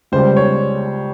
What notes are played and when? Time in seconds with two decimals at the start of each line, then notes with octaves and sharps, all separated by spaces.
0.12 C#2 C#3 G3 C5
0.37 C#5